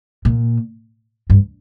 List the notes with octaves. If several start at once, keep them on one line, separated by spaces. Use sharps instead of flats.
A#2
G2